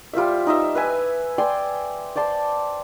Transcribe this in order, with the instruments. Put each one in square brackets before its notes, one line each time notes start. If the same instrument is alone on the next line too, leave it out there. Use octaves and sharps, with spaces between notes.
[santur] G3 F4 C5 E5
D#4 D#5 E5
B4 E5 G#5
D5 G5 G#5 C6
C5 D5 A5 C6